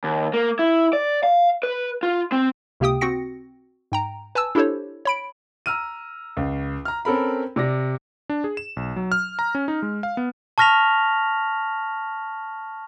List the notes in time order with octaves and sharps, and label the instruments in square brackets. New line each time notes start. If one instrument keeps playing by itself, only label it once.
[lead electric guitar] D#2
A#3
E4
D5
F5
B4
F4
C4
[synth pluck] C#2 C3 A#3 G4 G5 D#6
C4 F#4 G5 A#6 C#7
G#2 G5 A#5
B4 G#5 A5 E6
D4 E4 G4 A4 C5 C#5
C#5 B5 D7
[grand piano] A#5 E6 F6 D#7
C#2
A#5 F6
C4 C#4 A4 A#4 B5
C3 D5 A#6
[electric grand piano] D4
G#4
E7
B1
F#3
F6
A#5
C#4
D#4
G#3
F5
B3
[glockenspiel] A5 C#6 F6 A#6 B6 F7